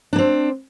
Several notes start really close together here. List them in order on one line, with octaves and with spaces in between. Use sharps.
D4 A#3 C4